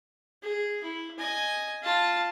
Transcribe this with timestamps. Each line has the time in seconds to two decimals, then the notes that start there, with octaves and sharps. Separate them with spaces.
0.43 G#4
0.84 E4
1.18 D#5 G#5
1.82 F4 A5